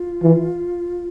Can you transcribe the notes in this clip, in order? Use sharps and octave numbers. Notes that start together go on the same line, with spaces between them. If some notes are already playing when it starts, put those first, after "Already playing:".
Already playing: F4
E3